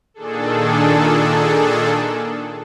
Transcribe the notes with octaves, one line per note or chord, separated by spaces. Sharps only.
A#2 D#3 D4 G#4 A4